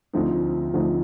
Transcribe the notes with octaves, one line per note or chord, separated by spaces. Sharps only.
D2 D3 F3 C4 D#4
D2 D3 F3 C4 D#4